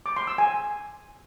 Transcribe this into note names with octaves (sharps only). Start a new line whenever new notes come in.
D6
C6
E6
G#5